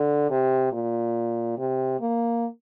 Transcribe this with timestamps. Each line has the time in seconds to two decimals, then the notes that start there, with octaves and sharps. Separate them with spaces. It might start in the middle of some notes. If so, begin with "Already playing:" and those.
Already playing: D3
0.30 C3
0.72 A#2
1.58 C3
2.01 A#3